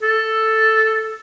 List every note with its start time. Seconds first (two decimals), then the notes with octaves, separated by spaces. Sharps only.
0.03 A4